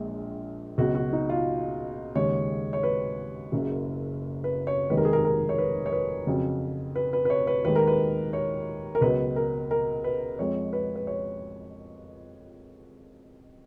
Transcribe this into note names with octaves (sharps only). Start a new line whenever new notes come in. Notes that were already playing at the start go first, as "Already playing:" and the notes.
Already playing: A#1 A#2 G#3
C#2 B2 F#3 F#4
F#4
D#4
F4
D#2 C#3 G#3 C#5
C#5
B4
F#1 F#2 C#3
B4
C#5
F1 D#2 D#3 G#3 B4
A#4
G#4
A#4
A#4
C#5
B4
C#5
B4
F2 C#3 F#3
B4
B4
B4
C#5
B4
D#2 D#3 G#3 B4
A#4
B4
C#5
A#4
C#2 B2 F#3 B4
A#4
A#4
B4
F2 F3 G#3 C#5
B4
B4
C#5